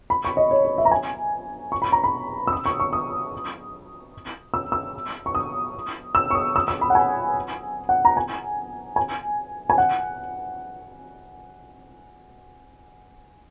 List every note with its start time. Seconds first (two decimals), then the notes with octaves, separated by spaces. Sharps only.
0.10 B5
0.25 C#6
0.37 D#5
0.51 C#5
0.65 C#5
0.78 E5
0.85 A#5
0.91 G#5
1.72 C#6
1.82 B5
1.92 A#5
2.04 B5
2.47 E6
2.52 D#6
2.66 C#6
2.80 C#6
2.93 D#6
4.54 E6
4.72 E6
5.26 C#6
5.35 D#6
6.15 E6
6.30 C#6
6.35 D#6
6.56 E6
6.68 E6
6.81 B5
6.90 F#5
6.95 G#5
7.89 F#5
8.05 A#5
8.17 G#5
8.96 G#5
9.70 G#5
9.78 F#5